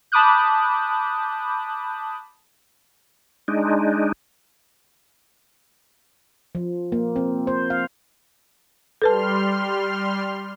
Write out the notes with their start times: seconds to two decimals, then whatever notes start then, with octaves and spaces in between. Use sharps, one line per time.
0.12 A5 B5 D6 D#6 F#6 G6
3.48 G#3 D4 D#4
6.55 F3
6.92 A#3
7.16 C4
7.47 C5
7.70 F5
9.02 G3 A4 B4 A5 C6 F6